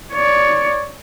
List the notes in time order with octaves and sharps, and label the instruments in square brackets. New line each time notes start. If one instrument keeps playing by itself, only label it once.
[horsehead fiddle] C#5 D5